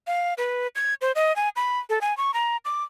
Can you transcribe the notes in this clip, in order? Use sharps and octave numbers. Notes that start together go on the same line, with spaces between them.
F5
B4
G#6
C5
D#5
G#5
B5
A4
G#5
C#6
A#5
D6